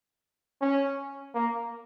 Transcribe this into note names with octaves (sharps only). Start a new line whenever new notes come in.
C#4
A#3